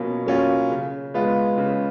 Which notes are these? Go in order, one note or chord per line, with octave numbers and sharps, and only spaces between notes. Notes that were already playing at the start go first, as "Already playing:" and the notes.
Already playing: B2 F#3 A#3 C#4 F4
F#3 A#3 C#4 F4
C#3
G#3 B3 F4
C#3